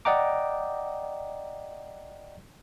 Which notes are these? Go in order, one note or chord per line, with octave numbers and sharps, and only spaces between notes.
D5 D#5 F#5 G5 A#5 D6